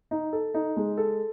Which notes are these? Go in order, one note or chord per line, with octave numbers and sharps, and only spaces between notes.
D#4
A4
D#4
G#3
A4